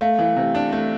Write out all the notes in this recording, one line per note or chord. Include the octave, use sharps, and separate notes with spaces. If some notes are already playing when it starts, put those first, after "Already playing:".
A3 F5
E3
C3
D4
A3